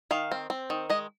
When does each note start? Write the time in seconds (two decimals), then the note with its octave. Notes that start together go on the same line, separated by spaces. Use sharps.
0.11 D#3 F5
0.32 C4
0.50 C4
0.70 D#3
0.90 G#3 D#5